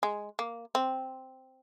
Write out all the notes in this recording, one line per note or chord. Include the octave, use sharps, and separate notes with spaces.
G#3
A#3
C4